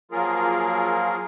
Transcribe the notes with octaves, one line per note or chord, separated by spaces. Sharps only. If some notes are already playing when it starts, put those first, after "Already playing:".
F3 F#3 A#3 F4 G#4 A#4